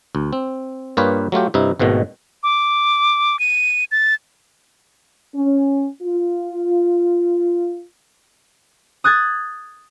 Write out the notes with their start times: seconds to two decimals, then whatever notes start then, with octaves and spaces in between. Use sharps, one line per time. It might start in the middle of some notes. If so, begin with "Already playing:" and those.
0.15 D2
0.33 C4
0.97 G2 A#3 F4 G4 B4 C#5
1.32 F#3 A3 F4 G4
1.54 G2 C3 D#4 E4
1.79 G#1 G#2 B2 D#3 A3
2.43 D6
3.39 D#7
3.92 A6
5.35 C#4
6.02 F4
9.04 D#6 F#6 G#6 A6